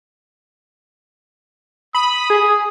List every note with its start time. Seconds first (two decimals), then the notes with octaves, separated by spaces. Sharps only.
1.95 B5 D#6
2.30 G#4